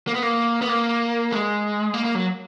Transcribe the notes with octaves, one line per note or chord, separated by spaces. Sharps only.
A#3
B3
A#3
B3
A#3
G#3
A#3
A#3
F#3